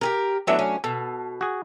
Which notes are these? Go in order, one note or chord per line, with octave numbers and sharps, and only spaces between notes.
G4 G#4 A#4
E3 F#3 A3 B3 D4 E5
C#4
B2 A4
F#4 G#4